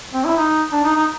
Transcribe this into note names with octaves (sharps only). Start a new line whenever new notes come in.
C4
E4
D#4
D4
D#4
D#4